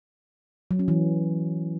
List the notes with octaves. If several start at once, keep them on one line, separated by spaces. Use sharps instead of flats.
F#3
C#4
E3